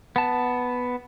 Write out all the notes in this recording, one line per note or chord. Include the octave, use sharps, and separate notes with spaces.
B3 A5